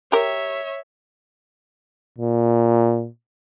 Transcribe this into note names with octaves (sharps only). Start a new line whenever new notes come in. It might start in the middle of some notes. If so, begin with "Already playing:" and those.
G4 A#4 C#5 E5
A#2